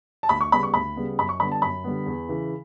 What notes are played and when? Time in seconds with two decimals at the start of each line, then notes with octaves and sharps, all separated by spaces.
0.23 A5
0.29 D2 B5
0.41 C#6
0.52 C#3 G3 B3 B5
0.63 C#6
0.74 D2 B5
0.96 C#3 G3 B3
1.18 F#2 B5
1.29 C#6
1.40 D3 G3 B3 B5
1.52 A5
1.62 F#2 B5
1.84 D3 G3 B3
2.06 E2
2.29 C#3 E3